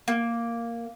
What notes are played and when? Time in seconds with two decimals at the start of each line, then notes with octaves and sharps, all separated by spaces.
0.08 A#3